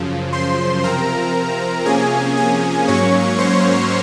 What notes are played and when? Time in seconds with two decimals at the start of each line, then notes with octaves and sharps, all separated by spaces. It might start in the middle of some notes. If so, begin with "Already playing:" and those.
Already playing: F#2 C#3 F3
0.33 C5 C6
0.83 C3 F3 C4 A#4 A#5
1.86 C3 F3 A#3 C#4 G#4 G#5
2.36 G#4 G#5
2.87 G#2 F#3 A#3 C#4 C#5 C#6
3.38 C5 C6